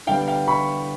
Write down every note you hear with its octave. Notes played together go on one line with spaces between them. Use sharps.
D3 G3 B3 F5 G5
F5 G5
B5 C#6